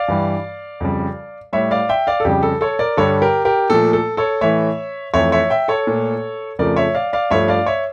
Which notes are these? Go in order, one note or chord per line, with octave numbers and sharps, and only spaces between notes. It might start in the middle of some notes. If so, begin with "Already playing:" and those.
Already playing: D5 F5
G2 E3 G3
F2 C#3 G3
A2 G3 C#5 E5
D5 F5
E5 G5
D5 F5
A4
F2 C#3 G3 G4
A4
A4 C#5
A#4 D5
G2 D3 G3 A4 C#5
G4 A#4
G4 A#4
A#2 F3 A3 A4
A4
A4 C#5
A2 E3 A3 C#5 E5
F2 E3 A3 C#5 E5
C#5 E5
E5 G5
A4 C#5
A#2 A3
F2 C#3 F3 A3 A#4 D5
C#5 E5
D5 F5
D5 F5
G2 F3 A3 C#5 E5
D5 F5
C#5 E5